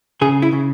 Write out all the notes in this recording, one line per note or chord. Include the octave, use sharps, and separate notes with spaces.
C#3 G#4
E4
C#3